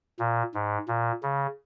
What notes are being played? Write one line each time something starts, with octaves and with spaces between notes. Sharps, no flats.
A#2
G#2
A#2
C#3